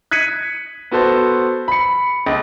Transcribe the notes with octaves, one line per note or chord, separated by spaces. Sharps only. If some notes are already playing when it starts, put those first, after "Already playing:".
F#6 G#6 B6 C#7 D#7
B3 F#4 A4 C5
B5 C#7
C#2